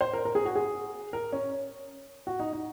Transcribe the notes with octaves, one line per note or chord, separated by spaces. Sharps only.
C5
A#4
A#4
G#4
F#4
G#4
A#4
C#4
F#4
D#4
D#4